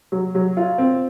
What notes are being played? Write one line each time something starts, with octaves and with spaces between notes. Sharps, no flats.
F#3
F#3
F4
C4